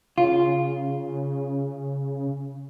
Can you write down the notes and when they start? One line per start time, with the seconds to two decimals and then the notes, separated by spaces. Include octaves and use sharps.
0.18 C#3 F4